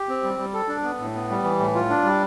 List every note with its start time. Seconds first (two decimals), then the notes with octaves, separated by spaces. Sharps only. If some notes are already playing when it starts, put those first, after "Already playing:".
Already playing: G4
0.09 C4
0.23 G3
0.38 G3
0.54 A4
0.68 D4
0.84 B3
1.00 A2
1.15 B3
1.30 G3
1.44 E3
1.59 A2
1.75 F4
1.89 D4
2.04 G3